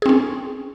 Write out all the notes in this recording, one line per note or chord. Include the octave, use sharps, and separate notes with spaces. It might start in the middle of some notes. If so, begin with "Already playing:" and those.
C4 C#4 G#4